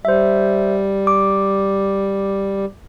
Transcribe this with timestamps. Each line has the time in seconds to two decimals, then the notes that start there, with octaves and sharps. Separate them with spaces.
0.05 G3 C5 E5
1.07 D6